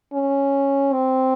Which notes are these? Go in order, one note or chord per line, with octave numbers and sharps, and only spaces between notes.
C#4
C4